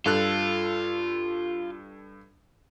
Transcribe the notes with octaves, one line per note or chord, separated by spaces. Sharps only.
G2 F4 A4 F#6